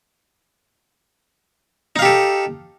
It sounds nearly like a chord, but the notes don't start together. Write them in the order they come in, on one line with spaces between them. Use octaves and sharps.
D#4 F5 G4 A4